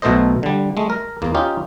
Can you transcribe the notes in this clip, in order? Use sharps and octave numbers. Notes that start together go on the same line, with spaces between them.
B1 B2 A3 A4 C5 D#5
D3 G3
G#3 A3
A#4
E2 A#3
C#4 D#4 F4 G4